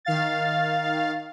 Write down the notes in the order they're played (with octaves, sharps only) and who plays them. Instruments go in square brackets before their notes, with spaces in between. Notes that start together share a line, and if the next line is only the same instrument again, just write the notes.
[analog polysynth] D#3 F5 A6